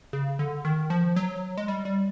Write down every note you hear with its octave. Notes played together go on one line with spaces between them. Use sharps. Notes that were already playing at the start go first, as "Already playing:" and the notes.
C#3
D3
D#3
F3
F#3
G#3
G3
G3